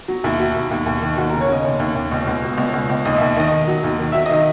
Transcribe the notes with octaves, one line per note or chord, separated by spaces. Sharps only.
F#3
D#2 E4
F#3
D#2
D#2
D#2
D#3
D#2 F#4
C#3 A#4
C#5
C#3 D#5
D#2 C#5
D#2
D#2
C#2
C#2
B2
C#2
C#2
C#2
D#2 D#5
D#2 E5
D#3 D#5
D#3
F#3
D#2
D#3
F#3 E5
D#3 D#5